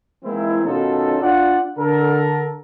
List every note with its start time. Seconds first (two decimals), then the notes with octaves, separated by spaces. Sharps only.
0.25 E3 G#3 A#3 C4 D#4 E4
0.66 B2 D#3 C#4 D#4 F4 A4
1.22 D4 F4 D5 F#5
1.79 D3 A4 A#4